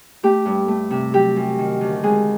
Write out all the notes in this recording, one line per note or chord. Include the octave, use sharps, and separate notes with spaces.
A3 G4
G2
A3
C3
F#3 G4
F#2
D#3
D2
G#3 G#4